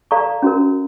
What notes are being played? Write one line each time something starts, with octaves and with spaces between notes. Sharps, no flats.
A4 D5 F5 A#5 C#6
C#4 F#4 A#4